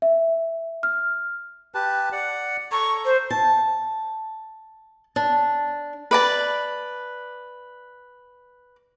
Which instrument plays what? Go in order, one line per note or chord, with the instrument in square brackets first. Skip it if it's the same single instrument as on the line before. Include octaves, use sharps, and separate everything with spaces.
[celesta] E5
F6
[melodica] G4 B4 A5
D5 F#5
[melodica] A4 A#5 [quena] C#6
[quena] C5
[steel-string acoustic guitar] A5
D4
[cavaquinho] B4 D5 A5